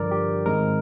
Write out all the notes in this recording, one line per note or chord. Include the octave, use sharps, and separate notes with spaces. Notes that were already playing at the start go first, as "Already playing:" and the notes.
Already playing: G2 D3 F3 A#4 D5
G4
G#2 D#3 G#3 C4 A#4